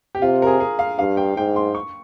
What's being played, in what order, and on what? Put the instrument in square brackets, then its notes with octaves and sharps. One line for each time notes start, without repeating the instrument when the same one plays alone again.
[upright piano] G4
[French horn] C3 [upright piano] F4
[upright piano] A#4
G#4
G#4
F5
[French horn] G2 [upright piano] F5
[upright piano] G5
[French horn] G#2 [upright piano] G5
[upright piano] C6
C#6